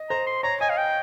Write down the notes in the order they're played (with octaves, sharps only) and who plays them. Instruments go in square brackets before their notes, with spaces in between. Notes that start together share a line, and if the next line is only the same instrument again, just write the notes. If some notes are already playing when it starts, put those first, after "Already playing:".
Already playing: [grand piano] D#5
[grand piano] C5 [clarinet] A#5
[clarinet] C6
[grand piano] C#5 [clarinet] A#5
[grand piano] D#5 [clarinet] G#5
[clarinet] F5
G5